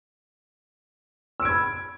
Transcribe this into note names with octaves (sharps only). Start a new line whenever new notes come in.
B5 E6 G#6 D7